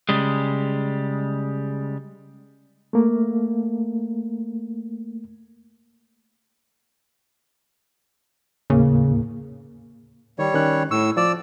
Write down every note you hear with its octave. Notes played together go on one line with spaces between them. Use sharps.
C#3 G3 G#3
A3 A#3
D#2 A2 C#3 A#3
D#3 G3 C#5
D#3 C#4 F#6
A2 C#6 E6
F3 D5 E6